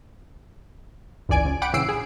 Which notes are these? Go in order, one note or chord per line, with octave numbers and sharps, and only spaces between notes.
G1 C#2 E3 D5 G#5 D7
C#2
F#5 G5 B5 D6 D7
A#1 C#3 E3 E6 C7 D7
G#4